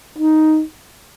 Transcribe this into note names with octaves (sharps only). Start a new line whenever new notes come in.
D#4